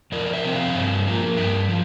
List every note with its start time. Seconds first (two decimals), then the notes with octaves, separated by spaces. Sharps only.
0.12 F2 A#4 D5
0.26 D5
0.33 C5 E5
0.44 C3 F3 C4 G5
0.54 D5 F5
0.65 D5
0.74 G2 C5 E5
1.06 F3 A#3
1.37 G2 E5 G5
1.68 F3